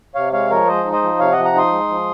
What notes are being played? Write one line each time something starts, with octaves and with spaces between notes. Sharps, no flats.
C3 C#5 F5
G#3 C#5 F5
F3 A#4 C#5
G#3 C5 D#5
D#4
C5 D#5
F3
C3 C#5 F5
D#5 F#5
F3
F#5 A#5
D#4 C6 D#6
G#3
F3